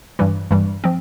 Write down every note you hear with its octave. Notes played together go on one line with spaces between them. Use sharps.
G2 E3 G3
G2 E3 G3
F3 C4